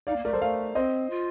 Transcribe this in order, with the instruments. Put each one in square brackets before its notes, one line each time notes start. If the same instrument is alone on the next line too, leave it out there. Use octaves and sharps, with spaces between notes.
[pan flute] D#4 [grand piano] D5 F5
[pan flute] A#3
[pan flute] A3 [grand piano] A#4 D5
[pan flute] G3 [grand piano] A4 C5
[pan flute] A3 [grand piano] D5 F5
[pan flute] C4 [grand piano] C5 D#5
[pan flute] F4